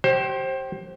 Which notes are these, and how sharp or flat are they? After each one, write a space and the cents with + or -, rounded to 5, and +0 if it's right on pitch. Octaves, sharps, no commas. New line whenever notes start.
G4 -25 C5 +25